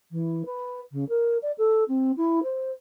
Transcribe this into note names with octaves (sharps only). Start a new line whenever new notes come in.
E3
B4
C#3
A#4
D5
A4
C4
E4
C5